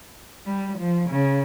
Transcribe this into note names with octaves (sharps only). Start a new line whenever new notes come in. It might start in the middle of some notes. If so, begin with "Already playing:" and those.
G3
F3
C#3